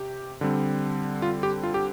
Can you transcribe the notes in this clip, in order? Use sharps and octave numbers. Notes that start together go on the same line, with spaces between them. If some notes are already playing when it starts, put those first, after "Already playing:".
Already playing: C3 G4
D3 G3 C4
F4
G4
F4
G4